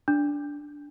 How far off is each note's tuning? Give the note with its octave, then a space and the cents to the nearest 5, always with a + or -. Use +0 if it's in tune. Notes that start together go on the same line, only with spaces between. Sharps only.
D4 -10